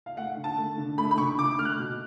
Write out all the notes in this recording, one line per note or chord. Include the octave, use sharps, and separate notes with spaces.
F5
A3 F#5
D3
A5
A3
D3
A3 B5
B5
D3 C#6
D3 D6
A3 F6
F#6
B2